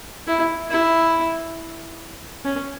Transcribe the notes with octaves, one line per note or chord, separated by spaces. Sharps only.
E4
E4
C#4